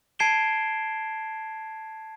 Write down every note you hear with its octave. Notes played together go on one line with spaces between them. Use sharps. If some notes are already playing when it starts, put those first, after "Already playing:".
A5 G#6 C7 D7 E7 G7